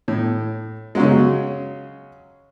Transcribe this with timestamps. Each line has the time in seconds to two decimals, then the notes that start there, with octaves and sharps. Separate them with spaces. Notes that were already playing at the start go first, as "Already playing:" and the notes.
0.08 A2
0.95 C#3 F#3 G#3